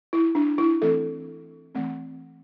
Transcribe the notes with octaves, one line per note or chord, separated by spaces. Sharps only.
E4
D4
E4
E3 A3 C4 A4
E3 A3 C4